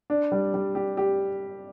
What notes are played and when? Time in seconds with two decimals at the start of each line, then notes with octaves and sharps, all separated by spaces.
0.10 D4
0.32 G3
0.54 G3
0.75 G4
0.97 G4